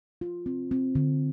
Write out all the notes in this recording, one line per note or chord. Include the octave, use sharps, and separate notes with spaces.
F4
C4
C4
D3